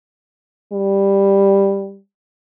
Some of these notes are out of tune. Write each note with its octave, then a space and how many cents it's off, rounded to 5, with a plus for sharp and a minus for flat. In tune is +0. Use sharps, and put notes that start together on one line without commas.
G3 +5